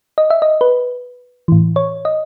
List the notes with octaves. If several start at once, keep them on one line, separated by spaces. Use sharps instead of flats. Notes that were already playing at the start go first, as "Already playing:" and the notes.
D#5
E5
D#5
B4
A2 E3
C#5
D#5